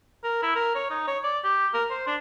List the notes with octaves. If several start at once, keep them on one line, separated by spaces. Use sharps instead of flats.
A#4
E4
A#4
C#5
D#4
C#5
D5
G4
A#4
C5
D4